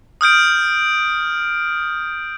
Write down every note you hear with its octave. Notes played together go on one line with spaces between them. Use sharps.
D#6 F6 G6 D7